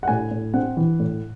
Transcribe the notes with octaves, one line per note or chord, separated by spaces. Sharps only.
F#5
A2 G#5
A2
C4 F#5
E3
A2